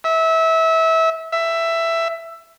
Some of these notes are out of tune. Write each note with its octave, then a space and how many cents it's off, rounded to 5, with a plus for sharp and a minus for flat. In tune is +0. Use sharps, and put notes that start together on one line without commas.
E5 -25
E5 +10